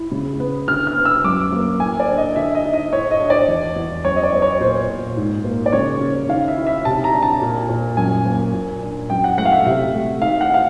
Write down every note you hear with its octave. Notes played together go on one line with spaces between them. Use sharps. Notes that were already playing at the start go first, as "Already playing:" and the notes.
Already playing: E4
C#3
B3
D3 F6
F6
B3
E6
F#2 D6
A#3
A2 G#5
D5
D4
D#5
D3 E5
D#5
D#4
D#5
A2 C#5
D#5
D4
D5
E2
E2
F#2 C#5
D#5
D5
B3
C#5
A#2 C5
A#2
G#2
A#3
D5
C#3 C#5
C#4
D#3 F5
E5
E4
E5
C3 A5
A#5
D4
A5
A#2
A#2
F#2 G#5
A#3
A#2
D4
F#2 G5
F#5
A3 F#5
F5
E5
F5
C3 E5
A3
D#3 F5
F#5
D#4 F5